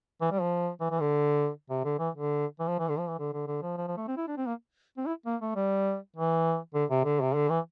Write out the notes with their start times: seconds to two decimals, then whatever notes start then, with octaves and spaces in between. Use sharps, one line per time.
0.21 E3
0.31 G3
0.41 F3
0.81 E3
0.91 E3
1.00 D3
1.70 C3
1.85 D3
1.99 E3
2.15 D3
2.60 E3
2.68 F3
2.79 E3
2.89 D3
2.98 F3
3.08 E3
3.19 D3
3.33 D3
3.47 D3
3.62 F3
3.77 F3
3.88 F3
3.97 A3
4.08 C4
4.17 E4
4.28 D4
4.37 C4
4.46 A#3
4.97 C4
5.06 E4
5.26 A#3
5.42 A3
5.55 G3
6.16 E3
6.74 D3
6.90 C3
7.04 D3
7.22 C3
7.35 D3
7.49 E3